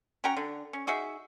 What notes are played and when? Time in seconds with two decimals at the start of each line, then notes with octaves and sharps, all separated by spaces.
0.24 C#4 F#4 G5 A#5
0.37 D3
0.73 C#4
0.87 D#4 F#4 G#4 E5